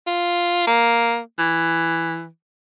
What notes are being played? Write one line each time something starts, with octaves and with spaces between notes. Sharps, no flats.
F4
A#3
E3